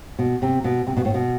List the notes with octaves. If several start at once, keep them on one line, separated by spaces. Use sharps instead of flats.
B2
C3
B2
C3
B2
A2
B2